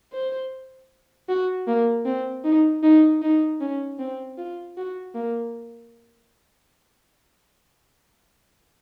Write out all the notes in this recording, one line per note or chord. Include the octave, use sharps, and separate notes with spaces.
C5
F#4
A#3
C4
D#4
D#4
D#4
C#4
C4
F4
F#4
A#3